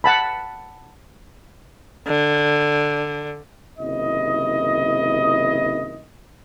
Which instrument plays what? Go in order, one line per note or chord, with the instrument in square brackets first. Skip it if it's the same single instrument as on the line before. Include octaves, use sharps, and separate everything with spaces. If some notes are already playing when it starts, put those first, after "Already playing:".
[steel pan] F#5 A5 B5
[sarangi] D3
[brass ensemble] F#1 C3 D#3 E4 D#5